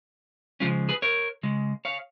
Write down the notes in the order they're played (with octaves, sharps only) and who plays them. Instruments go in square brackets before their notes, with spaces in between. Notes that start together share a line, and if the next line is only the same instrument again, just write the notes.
[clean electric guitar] C#3 F3 G#3 C#4 F4
G#4 B4
A#4 C#5
C#3 G#3
C#5 F5